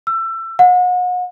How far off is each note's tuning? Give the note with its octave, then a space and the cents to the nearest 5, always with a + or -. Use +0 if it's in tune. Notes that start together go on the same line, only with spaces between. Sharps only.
E6 +25
F#5 -40